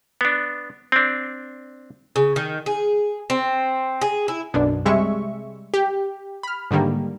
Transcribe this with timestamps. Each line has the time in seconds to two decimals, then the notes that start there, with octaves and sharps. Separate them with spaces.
0.21 B3 D4
0.92 C4 D4
2.16 C#3
2.36 D#3
2.66 G#4
3.30 C4
4.01 G#4
4.28 E4
4.54 B1 F#2 B2 D4
4.85 C3 G3 G#3 E5 C#6
5.74 G4
6.43 B5 F6
6.71 G#2 D3 D#3 G3 A#3